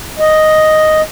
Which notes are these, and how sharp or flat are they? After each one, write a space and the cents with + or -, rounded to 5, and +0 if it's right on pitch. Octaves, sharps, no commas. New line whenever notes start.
D#5 +0